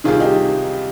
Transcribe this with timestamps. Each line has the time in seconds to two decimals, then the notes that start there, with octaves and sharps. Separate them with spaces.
0.04 C2 C3 D#3 F4 G#4
0.20 D#4 G4